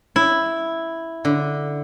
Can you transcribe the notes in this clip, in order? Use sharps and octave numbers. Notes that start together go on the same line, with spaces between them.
E4
D3